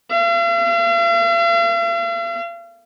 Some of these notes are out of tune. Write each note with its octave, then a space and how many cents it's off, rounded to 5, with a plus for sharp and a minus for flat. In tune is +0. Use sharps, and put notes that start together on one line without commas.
F5 -45